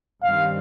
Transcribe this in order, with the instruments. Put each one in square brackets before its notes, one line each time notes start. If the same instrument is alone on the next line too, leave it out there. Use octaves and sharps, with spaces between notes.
[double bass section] G2 D#3 G3 C4 [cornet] F5